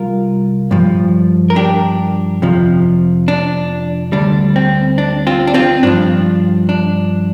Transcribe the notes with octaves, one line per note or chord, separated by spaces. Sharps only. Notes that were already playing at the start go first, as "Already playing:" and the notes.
Already playing: C2 G3 F4 A#4
G2 F3
A#4
D4 G4
F2 C3 F3
D4
D2 D3 G3 D4
C4
D4
C4 F4
D4
C4 F4
G2 F3 D4
D4